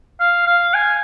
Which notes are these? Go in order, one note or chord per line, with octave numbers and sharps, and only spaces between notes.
F5
F5
G#5